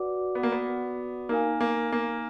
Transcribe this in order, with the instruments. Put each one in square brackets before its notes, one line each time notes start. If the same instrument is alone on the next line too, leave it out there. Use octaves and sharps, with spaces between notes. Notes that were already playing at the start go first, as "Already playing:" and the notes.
Already playing: [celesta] F#4 B4 D5 F#5 D6
[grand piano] B3
A#3
B3
[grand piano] A#3 [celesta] D#4 A#4 F5 G#5
[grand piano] A#3
A#3